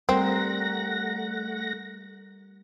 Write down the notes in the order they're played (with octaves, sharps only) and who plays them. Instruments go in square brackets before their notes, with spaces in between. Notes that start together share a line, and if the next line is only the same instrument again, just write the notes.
[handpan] G3 A#4 [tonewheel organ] A3 F#5 A#6 [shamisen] C4